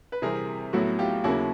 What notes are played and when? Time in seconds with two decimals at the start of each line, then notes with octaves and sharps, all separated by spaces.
0.12 B4
0.22 C3 E3 G3 C4 G#4 A#4
0.73 A2 F#3 B3 E4 F#4
0.99 F4 G4
1.24 D#2 C#3 F#3 A#3 C#4 E4 F#4